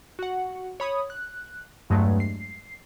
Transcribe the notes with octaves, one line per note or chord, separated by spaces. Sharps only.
F#4 F#5
C#5 B5 D#6
F#6
E2 G2 F#3 G#3 A3
C7